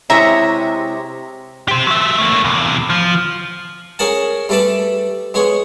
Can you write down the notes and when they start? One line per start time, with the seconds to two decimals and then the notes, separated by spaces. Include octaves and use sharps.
0.10 C3 G#3 E4 C#5 E5 A#5
1.68 G4 C5
1.87 F#3 E5
2.18 A3 A#3
2.44 E2 C3
2.90 F3
3.99 C#4 G#4 A#4 F#5 A5
4.49 G3 A3 A4 B4 D5 A5
5.34 G#3 B3 G#4 C#5